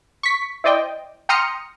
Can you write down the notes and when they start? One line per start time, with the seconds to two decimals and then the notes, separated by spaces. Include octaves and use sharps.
0.23 C#6 B6
0.64 E4 C5 D5 D#5 G5
1.29 G5 A#5 C6 D#6 F6 C#7